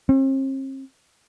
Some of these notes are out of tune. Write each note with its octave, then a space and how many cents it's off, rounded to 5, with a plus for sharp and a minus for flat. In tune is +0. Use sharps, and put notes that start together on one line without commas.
C4 +45